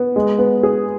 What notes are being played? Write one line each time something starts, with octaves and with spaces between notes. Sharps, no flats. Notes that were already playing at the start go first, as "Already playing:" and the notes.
Already playing: B3
G#3
B3
G#4